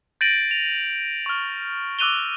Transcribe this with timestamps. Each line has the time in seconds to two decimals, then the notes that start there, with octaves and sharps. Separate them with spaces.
0.21 G6 A6 A#6 D7 D#7 F#7
0.51 F7
1.26 C#6 F6
1.99 D6 E6 F#6 D#7 F7 G7